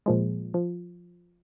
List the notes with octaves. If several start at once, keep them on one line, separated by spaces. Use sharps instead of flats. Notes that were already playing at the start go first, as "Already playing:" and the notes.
A#2 F3 G#3
F3